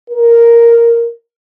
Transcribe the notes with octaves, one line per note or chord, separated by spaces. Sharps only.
A#4